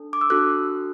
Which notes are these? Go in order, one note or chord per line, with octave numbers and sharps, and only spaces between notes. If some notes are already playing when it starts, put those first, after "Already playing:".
Already playing: D4 A4
D6
E6
D4 F#4 A4 F#6